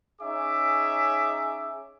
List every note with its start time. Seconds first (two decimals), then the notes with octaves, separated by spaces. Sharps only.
0.21 C#4 D#4 G#4 E5 D6